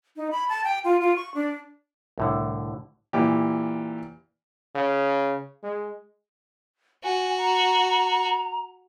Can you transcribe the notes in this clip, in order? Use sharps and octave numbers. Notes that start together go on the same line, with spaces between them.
D#4
B5
A5
G5
F4
F4
C#6
D4
C2 A2 D3
A#2 E3 G4
C#3
G#3
F#4 G#5
A#5